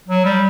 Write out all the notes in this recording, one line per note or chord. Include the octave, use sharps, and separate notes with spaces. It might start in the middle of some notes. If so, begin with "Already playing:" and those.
F#3
G3